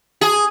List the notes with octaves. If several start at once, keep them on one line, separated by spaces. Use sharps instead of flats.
G#4